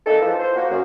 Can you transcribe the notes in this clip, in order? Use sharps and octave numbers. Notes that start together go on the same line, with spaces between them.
A#3 D#4 A4
G#2 E3 F3
C5
A#3 F#4
F#2